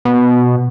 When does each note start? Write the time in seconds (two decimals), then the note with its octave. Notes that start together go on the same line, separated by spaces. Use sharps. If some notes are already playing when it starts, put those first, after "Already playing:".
0.05 B2